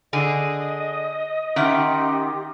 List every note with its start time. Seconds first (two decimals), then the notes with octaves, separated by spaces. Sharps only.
0.13 D3 G#4 D#5
1.56 D#3 C#4 D#4 G4 E5 C6 F6